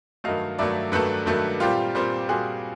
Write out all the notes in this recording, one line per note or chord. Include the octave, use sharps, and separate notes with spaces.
G2 D#3 F#3 A3 D#5 F5
G2 D#3 F#3 A3 D5 E5
G2 D#3 F#3 A3 A4 B4
G2 D#3 F#3 A3
A#2 G3 C4 F4 G4
A#2 G3 C4
A#2 G3 C4 F#4 G#4